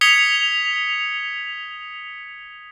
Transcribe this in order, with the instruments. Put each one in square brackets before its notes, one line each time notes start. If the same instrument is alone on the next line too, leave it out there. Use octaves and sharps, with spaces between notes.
[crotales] D#6 G#6 B6 C#7 F7 G7